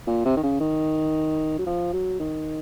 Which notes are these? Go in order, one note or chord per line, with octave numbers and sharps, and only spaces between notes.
A#2
C3
D#3
C#3
D#3
F#3
F3
F#3
D#3